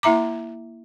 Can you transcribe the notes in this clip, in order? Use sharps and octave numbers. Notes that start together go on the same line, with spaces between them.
A#3 E4 E5 A#5 D6